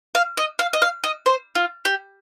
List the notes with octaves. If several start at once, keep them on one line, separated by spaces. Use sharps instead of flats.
F5
D#5
F5
D#5
F5
D#5
C5
F4
G4